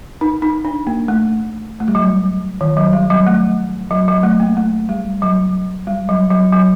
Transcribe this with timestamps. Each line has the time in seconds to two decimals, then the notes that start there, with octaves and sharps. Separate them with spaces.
0.21 D#4
0.42 D#4
0.65 D4
0.87 A#3
1.08 A3
1.80 A3
1.88 G3
1.95 F#3
2.61 D#3
2.77 F#3
2.93 G3
3.10 F#3
3.27 A3
3.91 F#3
4.08 F#3
4.23 A3
4.40 A#3
4.57 A3
4.89 G3
5.22 F#3
5.87 G3
6.09 F#3
6.31 F#3
6.53 F#3